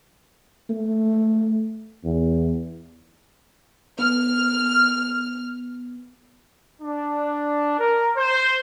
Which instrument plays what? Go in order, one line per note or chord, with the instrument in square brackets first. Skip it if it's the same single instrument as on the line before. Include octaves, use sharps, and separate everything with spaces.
[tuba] A3
E2
[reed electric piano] B3 [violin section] F6
[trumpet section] D4
A#4
C5